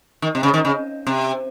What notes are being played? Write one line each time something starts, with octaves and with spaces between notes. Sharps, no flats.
D#3
C3
C#3
D#3
C#3
C3